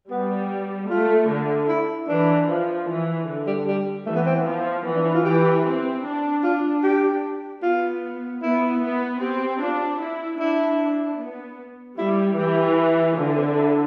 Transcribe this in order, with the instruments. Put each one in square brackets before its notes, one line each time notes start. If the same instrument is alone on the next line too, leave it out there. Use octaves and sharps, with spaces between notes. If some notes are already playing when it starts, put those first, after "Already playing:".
[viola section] G3 [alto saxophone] B3
[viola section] A3 [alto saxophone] F4
[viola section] D3
[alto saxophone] E4
[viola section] E3 [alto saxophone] D4
[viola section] F3
E3
D3
[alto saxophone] G3
G3
[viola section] E3 [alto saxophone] A3
[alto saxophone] B3
C4
B3
[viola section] F3
[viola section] E3 [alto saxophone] B3
[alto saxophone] D4
E4
F4
[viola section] E3 [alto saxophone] G4
[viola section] C4
D4
[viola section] D4 [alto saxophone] F4
[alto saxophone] G4
[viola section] B3 [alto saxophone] F4
[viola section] B3 [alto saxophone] E4
[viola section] B3
[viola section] C4 [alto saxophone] G4
[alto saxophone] G4
[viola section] D4 [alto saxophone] F4
[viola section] E4
[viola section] D4 [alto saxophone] E4
[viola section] B3
[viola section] G3 [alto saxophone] E4
[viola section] E3 [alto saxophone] G4
[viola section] D3 [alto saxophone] F4
[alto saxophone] D4
C4
D4
E4